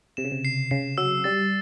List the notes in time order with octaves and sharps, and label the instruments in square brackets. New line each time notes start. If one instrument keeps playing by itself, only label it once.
[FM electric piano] C3 [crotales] E7
[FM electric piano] C#3
C3
[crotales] C7
[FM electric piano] C#3 [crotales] C7
[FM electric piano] F#3 [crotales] E6
[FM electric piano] G3 [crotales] A6